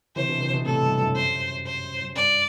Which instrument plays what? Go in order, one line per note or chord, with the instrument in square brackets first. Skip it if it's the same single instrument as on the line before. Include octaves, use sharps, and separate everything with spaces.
[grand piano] C3 E3 [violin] C5
[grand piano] B2 D3
C3 E3
B2 D3
[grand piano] A2 C3 [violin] A4
[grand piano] G2
F#2
[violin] C5
C5
[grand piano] F#2
[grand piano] G2 [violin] D5